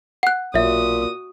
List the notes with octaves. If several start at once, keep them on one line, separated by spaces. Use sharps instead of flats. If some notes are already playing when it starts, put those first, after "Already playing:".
F#5 F#6
B1 A#2 F#4 C#5 E5 D#6